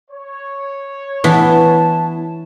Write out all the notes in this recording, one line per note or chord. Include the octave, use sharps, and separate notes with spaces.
C#5
E3 B3 D4 E4 A5